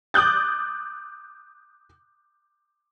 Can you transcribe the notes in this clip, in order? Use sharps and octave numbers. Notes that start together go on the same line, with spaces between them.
D6 D#6 F#6 G6 A6